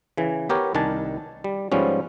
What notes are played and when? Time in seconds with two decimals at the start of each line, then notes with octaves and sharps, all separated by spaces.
0.17 C#3 E3
0.49 B3 G4 A#4 C#5
0.75 C2 D#3 D4 G#5 A5
1.44 G3
1.72 G#2 F3 G3 B3 C#4